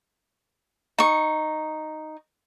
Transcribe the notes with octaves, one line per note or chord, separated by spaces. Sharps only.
D#4 C#6